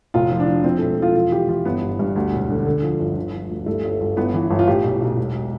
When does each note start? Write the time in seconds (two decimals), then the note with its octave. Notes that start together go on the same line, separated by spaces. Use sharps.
0.14 F1 F4
0.31 F3
0.40 D4
0.47 F3
0.64 F3 C4
0.78 E1 A3
0.98 F3 F4
1.14 E3 F4
1.32 E3 G4
1.48 E3 F4
1.65 G1 B3
1.83 G2
1.99 G2
2.16 D2
2.33 E1
2.50 D3
2.66 D3
2.83 F3
2.99 G1
3.17 D3
3.32 F3
3.49 D2
3.66 G2 A3
3.84 G1
4.01 G1
4.16 G1 B3
4.34 E3
4.50 G1
4.59 F4
4.68 A2 G4
4.84 B1
5.02 B1
5.18 E1